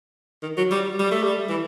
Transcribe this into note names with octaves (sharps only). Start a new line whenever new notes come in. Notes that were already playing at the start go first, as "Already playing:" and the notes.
D#3
F#3
G3
G3
A3
G3
E3